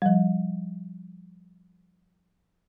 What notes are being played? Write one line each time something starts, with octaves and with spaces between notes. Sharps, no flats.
F3 G3